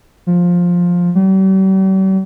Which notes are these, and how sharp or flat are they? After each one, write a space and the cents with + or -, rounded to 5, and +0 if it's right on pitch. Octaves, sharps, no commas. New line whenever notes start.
F3 +10
G3 -45